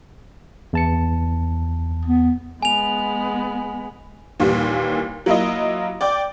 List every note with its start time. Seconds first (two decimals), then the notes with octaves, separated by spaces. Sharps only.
0.73 E2 A5 C#7
2.06 B3
2.63 G#3 B3 G#5 F7
4.40 D#2 A#2 E3 G3
5.26 F#3 A#3 E4 F4 D#5
6.01 D5 G5 D6